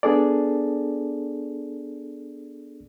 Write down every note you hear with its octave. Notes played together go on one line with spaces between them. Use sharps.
B3 D4 G#4 A4 D5